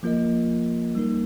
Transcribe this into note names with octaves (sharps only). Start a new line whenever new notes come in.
F3 A#3 F4 A#4 D#5
G3 A#3 D#4 A#4